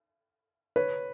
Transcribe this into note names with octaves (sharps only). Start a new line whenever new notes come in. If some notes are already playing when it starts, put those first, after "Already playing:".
B4 C#5